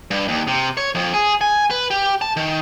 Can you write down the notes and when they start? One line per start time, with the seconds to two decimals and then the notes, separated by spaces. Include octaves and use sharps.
0.11 G2
0.28 D#2
0.47 C3
0.77 C#5
0.95 F2
1.14 G#4
1.41 G#5
1.71 B4
1.91 G4
2.22 A5
2.37 D#3